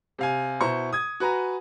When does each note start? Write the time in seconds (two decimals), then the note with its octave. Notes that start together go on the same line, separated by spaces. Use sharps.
0.18 C3 F5 G#5
0.61 B2 E4 C5 A#5 C#6
0.93 D#6 G#6
1.20 F#4 B4 G#5 A#5